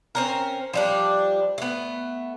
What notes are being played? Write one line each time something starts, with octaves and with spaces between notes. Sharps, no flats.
C4 C#4 A#4
F3 G3 D4
A3 B3